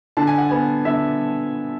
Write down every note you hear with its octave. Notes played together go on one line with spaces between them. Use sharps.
D3 A5
G#5
F#5
B3 G#5
D3 E5